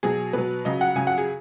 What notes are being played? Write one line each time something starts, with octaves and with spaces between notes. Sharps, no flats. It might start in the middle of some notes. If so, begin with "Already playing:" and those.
B2 F#3 G#4
B2 F#3 B4
C#3 F#3 D#5
F#5
C#3 F#3 G#5
F#5
G#4